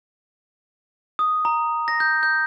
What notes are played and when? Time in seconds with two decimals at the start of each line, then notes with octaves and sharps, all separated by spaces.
1.19 D#6
1.45 A#5
1.88 A#6
2.00 G6
2.23 G6